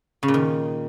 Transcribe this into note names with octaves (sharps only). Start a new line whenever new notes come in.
C#3
A#2
D#3